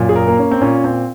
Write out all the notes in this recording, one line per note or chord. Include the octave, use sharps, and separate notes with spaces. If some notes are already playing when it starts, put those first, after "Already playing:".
Already playing: F#2 A#2
G#4
A#4
A#3
C#4
C4
A#2 C#4
C4